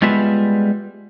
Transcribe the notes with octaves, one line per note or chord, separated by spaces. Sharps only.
G3 G#3 B3 F4 B4 E5